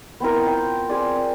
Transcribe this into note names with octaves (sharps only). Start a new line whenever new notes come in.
B3 C4 E4 A#4
F4 G5
C4 G#4 D5